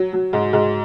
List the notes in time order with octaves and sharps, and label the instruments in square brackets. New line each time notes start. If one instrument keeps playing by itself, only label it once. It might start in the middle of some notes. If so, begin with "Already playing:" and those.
Already playing: [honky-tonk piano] F#3
F#3
G#2
G#2